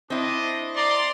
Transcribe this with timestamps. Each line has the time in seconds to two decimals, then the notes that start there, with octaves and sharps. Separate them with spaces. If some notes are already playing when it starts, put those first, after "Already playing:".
0.10 C4 D4 E4 D#5
0.76 D5 A#5 C6